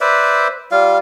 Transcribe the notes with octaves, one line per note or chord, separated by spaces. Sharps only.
B4 C5 D5 E5
G3 F4 F5